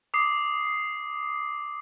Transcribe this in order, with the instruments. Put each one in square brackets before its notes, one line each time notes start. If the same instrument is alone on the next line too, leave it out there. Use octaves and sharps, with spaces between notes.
[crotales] D6 D#6 C7